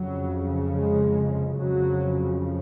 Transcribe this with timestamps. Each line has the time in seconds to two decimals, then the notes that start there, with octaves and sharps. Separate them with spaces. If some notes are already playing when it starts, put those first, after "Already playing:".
Already playing: F2 C#3 F#3
0.72 G#3
1.56 F2 C#3 F#3